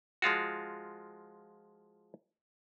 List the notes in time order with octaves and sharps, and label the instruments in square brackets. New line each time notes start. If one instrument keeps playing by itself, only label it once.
[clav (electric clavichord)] F3 G#3 F4 F#4